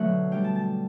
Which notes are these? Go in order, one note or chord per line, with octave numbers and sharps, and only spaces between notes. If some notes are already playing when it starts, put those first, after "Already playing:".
Already playing: B2 D3 F#3 A3 E5 F#5
D3 G3 B3 G5
A5
A5